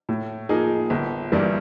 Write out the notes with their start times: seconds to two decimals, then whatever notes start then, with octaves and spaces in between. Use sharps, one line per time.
0.09 A2
0.49 F3 A#3 D#4 G#4
0.90 G1
1.32 G2 E3 G3 A#3